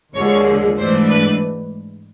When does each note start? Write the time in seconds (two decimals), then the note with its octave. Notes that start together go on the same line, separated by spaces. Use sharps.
0.15 D#2 D3 F3 G#3 C#5
0.77 G#2 E3 A3 D4 C5
1.09 B4